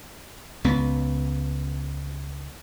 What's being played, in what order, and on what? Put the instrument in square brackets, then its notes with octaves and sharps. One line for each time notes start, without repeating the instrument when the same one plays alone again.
[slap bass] C#2 B3